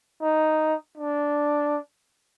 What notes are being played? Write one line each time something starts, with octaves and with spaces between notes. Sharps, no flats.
D#4
D4